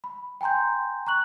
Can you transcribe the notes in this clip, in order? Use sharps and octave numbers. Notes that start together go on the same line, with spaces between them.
B5
G5 G#5 A#5 C6 G6
A#5 C#6 F#6 F#7